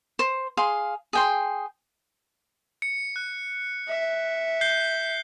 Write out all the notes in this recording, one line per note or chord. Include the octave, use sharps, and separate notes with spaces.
C5
G#4 F5 C6
G#4 G5 C6
C#7
F#6
E5
G6 C7 G7